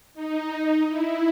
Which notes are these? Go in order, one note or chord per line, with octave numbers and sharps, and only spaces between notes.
D#4
E4